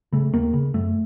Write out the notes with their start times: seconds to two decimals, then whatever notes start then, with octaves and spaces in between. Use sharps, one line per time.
0.12 C#3 A3
0.33 D#2 A#3
0.53 C#3
0.74 F#2 A3